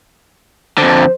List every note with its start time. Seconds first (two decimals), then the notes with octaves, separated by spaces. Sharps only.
0.78 F2 D3 C5